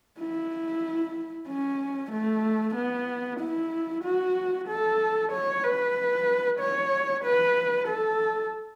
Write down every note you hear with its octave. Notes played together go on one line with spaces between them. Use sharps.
E4
C#4
A3
B3
E4
F#4
A4
C#5
B4
C#5
B4
A4